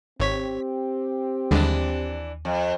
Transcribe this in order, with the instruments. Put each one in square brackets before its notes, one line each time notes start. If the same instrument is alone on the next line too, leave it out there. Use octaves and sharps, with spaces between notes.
[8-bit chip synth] G#1 C#5 B6 [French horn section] C4 G4
[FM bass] D#2 [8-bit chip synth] D3 G3 G#3 [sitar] E3 D4
[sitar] F2